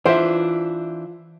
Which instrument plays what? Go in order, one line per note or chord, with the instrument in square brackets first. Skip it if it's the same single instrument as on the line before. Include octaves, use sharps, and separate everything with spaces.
[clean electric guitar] E3 D4 [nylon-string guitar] F4 [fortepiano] C5 E5